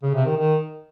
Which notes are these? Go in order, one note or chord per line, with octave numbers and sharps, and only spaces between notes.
C#3
C3
D#3
D#3